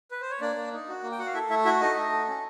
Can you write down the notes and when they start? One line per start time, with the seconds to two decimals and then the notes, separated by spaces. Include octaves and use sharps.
0.11 B4
0.21 C5
0.30 C#5
0.41 A#3 D4 D5
0.56 A#3
0.73 D#4
0.88 F#4
1.03 A#3
1.12 G5
1.19 F#4 F#5
1.26 F5
1.34 E4 A4 E5
1.49 A3 E4 E5
1.65 E4 F#4 E5
1.81 D#4 A4 D#5
1.97 A3
2.12 A4
2.28 C#4